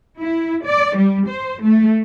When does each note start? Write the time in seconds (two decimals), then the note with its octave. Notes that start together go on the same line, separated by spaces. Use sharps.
0.20 E4
0.65 D5
0.97 G3
1.28 C5
1.62 A3